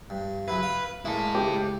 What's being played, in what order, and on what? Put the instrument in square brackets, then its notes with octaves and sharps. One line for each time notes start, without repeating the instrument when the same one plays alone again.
[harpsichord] G2
[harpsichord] C#3 F#3 E4 [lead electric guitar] B4
[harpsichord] F5
[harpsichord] G#3 A#3 [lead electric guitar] E4 A4
[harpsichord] C#2 [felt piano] G4